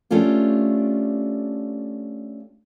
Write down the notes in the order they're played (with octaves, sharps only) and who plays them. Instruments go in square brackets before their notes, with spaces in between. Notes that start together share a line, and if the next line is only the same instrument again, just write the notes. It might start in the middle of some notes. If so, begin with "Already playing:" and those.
[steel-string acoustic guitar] A3 C#4 D4 F4 G4